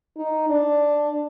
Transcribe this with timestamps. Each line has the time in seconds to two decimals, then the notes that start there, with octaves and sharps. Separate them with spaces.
0.17 D#4
0.50 D4